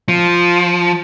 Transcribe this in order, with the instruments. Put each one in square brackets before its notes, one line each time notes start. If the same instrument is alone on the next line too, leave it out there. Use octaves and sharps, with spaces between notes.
[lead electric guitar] F3